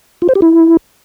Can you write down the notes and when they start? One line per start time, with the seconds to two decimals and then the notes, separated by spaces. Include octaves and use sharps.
0.22 F4
0.29 C5
0.35 G4
0.42 E4